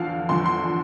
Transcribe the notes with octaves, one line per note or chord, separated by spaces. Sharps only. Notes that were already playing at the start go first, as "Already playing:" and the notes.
Already playing: E2 D3 F3 F5
E2 D3 F3 C6
C6